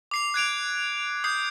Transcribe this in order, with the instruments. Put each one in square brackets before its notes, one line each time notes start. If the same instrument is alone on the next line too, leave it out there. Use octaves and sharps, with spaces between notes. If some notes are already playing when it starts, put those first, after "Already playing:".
[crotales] D6 C7 F7
F#6 G#6 D7 F7
D#6 G6 C7